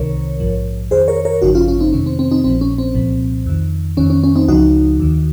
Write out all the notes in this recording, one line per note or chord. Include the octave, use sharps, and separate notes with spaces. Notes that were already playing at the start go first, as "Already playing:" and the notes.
Already playing: C2 C3 D#3 A#4 C#5
A#1 G#2 F3
F2 D#3 G#4 C5
A#4 C#5
A#4 C#5
G#1 F#2 C#3 F3 D#4 F#4
C#4 F4
C#4 F4
C4 D#4
F2 C3 D#3 C#4
C4
C4
C4 D#4
A#1 A#2 F3 C4
C#4
C4
C2 A#2 F3
F2 D#3
F2 D#3 C#4
C#4
C#4
C4 D#4
C#2 C#3 F3 D#4 F#4
D#2 D#3